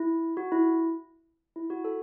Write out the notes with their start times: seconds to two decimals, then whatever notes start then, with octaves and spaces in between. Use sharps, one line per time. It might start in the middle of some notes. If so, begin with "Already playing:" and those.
Already playing: E4
0.37 F#4
0.52 E4
1.56 E4
1.70 F#4
1.85 A4